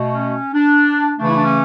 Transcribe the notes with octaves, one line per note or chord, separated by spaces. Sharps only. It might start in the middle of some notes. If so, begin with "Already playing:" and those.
Already playing: B2 A3
C#4
D4
C#3 E3 A3 D4
E4
D4
C#4